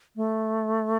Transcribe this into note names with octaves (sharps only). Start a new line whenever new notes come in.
A3